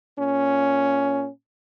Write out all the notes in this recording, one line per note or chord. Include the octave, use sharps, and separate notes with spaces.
A#2 C#4